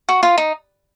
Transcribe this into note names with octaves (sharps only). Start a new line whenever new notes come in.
F#4
F4
D#4